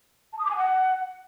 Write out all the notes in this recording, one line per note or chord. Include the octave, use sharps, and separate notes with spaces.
A5
D#6
D6
G#5
F#5